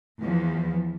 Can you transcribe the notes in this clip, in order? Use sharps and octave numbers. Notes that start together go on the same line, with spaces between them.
E2 F3